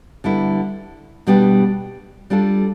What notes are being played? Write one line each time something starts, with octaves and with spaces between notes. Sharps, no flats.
D3 G3 B3 E4
B2 G3 B3 D4 G4
G3 D4 F4 A4